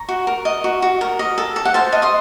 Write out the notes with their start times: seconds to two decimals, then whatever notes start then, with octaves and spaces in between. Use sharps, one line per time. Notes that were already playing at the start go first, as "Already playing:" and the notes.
Already playing: A#5 C#6
0.09 F#4
0.27 A#4
0.45 D#5
0.64 F#4
0.82 F#4
1.01 A#4
1.19 D#5
1.38 A4
1.56 A4
1.65 F#5
1.74 C5 F5 A5
1.92 D#5
2.02 C6 D#6